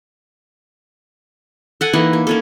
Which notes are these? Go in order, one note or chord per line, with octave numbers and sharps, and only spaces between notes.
A4 F#5 G#5
E3 A#3 D#4 E4
A#3
A#3 C#4 A4